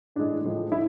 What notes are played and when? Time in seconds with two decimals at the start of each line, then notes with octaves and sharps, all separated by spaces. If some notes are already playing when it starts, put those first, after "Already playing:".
0.16 A2 E3 G#3 D4
0.44 A2 F3 G#3
0.72 A2 E4